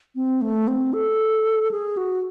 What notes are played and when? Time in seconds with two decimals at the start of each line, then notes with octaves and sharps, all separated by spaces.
0.15 C4
0.41 A3
0.68 C4
0.93 A4
1.71 G#4
1.97 F#4